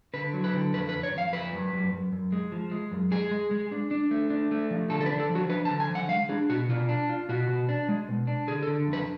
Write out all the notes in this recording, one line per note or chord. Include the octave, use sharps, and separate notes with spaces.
D3 B4
F#3
B4
D3
F2 B4
B4
F2
C#5
F2 F5
F3 B4
F#2
F#2
F#2
F#2
G#3
F3
G#3
F#2
G#3 G#4
G#3
G#3
D4
D4
A3
D4
A3
F3
D3 A4
A4
B4
D4
A4
F3
F#4
D4 B4
A5
D3
G#5
F3
F#5
G#3 F5
D4 G#4
B2 F#4
B2 F4
D4
F4
B2 F#4
B2
D4
G#3
B2
D4
D3 G#4
A4
D3
F2
B4